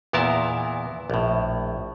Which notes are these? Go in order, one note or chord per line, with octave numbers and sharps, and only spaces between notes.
E2 A#2 B3 E4 A#4 A5
A#1 A2